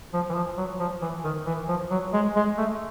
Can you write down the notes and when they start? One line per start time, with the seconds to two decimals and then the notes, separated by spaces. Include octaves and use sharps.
0.13 F3
0.29 E3
0.35 F3
0.57 F#3
0.80 F3
1.02 E3
1.24 D#3
1.46 E3
1.68 F3
1.91 F#3
2.13 G#3
2.36 G#3
2.58 A3